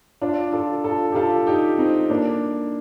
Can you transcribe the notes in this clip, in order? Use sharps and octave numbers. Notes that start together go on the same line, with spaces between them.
D4 F4
F4 A4
F4 A4
G4
F4 A4
D#4 G4
C4 D#4
A#3 D4